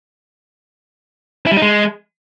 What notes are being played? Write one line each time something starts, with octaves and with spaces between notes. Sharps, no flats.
E4
G3
D#4
G#3